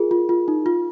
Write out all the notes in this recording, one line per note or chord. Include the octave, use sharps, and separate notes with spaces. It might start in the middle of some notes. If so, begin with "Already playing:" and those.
Already playing: F4 G#4 A#4
F4
F4
D#4
F4